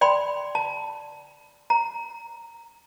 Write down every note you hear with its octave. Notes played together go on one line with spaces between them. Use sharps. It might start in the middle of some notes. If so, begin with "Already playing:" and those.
D5 G5 B5 C6
A5
A#5